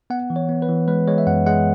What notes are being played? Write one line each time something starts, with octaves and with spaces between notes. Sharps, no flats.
B3 F#5
E3
C#5
B3
B4
E3
G#3 B4
G#3 C#5
E5
F#2 F#5
G#3 F#5